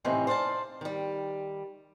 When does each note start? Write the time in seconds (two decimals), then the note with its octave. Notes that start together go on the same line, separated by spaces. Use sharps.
0.04 A2 C3 D#3 E3 C4 C#4
0.27 C5 D5 F5 F#5 A5
0.81 D#3 G3